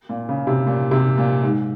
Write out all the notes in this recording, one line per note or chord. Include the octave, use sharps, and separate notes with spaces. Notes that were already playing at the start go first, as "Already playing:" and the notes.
A#2
C#3
C3
A#2
C3
A#2
G#2